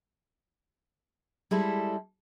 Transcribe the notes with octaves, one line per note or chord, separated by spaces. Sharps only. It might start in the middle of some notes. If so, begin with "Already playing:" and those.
G3 G#3 E4 A4